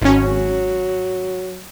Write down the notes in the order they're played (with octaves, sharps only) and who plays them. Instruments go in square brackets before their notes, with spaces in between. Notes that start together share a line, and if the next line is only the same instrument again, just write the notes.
[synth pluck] G#1 C#4 [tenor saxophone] F#3